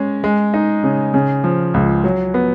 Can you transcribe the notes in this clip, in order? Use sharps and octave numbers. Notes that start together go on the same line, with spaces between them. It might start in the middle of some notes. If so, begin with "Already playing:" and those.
Already playing: G#3 C#4
G#3
D#4
C#3
C#3
F3
C#2
F#3
B3